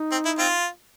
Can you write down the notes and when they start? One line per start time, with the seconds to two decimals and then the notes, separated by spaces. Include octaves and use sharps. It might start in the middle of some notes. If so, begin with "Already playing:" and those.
Already playing: D#4
0.12 C4
0.25 E4
0.38 C4 F4